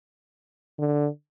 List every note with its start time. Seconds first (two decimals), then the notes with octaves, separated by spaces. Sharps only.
0.79 D3